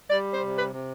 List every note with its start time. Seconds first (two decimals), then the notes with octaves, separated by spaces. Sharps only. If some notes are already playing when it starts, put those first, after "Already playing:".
0.09 G3 D5
0.33 C5
0.40 C3
0.56 B4
0.72 C3